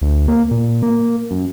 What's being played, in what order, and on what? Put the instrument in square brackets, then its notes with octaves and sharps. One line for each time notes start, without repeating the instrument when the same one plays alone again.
[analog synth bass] D2
A#3
A#2
A#3
F#2